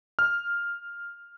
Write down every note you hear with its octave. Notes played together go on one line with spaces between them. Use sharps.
F6